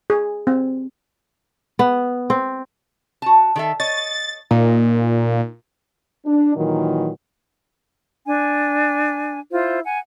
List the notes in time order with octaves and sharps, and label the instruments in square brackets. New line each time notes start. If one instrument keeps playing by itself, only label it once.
[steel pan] G#4
C4
[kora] B3
C4
[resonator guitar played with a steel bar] F#4 A5
D#3 A4 E5
[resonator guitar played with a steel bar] C#5 D#5 [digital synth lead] A6
[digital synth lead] A#2 [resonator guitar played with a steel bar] D#4
[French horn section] D4
A#2 D#3 E3 F#3
[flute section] D4 G#5
E4 F4 C5
F#5 G#5